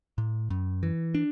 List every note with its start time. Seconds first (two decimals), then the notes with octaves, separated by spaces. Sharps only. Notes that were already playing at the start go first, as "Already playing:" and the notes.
0.18 A2
0.50 F#2
0.83 E3
1.15 D4